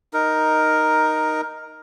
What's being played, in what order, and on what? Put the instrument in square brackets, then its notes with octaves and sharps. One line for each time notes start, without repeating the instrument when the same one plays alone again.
[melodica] D#4 A#4